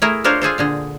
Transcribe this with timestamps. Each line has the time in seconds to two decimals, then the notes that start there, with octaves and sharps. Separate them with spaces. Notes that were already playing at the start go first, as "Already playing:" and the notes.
0.02 A3 E4 G#4 A#4
0.24 D4 F4 A#4 C5 C#5
0.41 F4 G#4 A4 C5
0.58 A#2 D3 G#4